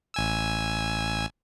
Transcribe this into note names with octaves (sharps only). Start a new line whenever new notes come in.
A1 G#5 E6